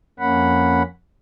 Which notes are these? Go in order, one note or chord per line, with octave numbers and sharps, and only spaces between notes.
F2 A#3 C#4 F#5 B5